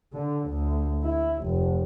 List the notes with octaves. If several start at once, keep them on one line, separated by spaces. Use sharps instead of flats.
D3
D2
E4
F1